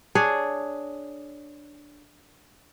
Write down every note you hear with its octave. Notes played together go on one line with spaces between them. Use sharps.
D4 G#4 C#5